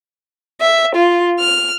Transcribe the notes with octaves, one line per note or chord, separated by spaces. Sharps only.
E5
F4
F6